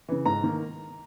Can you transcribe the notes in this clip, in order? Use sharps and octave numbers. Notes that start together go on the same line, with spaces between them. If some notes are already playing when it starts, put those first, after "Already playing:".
C#3 E3
G#2 A#5
D#3 A#3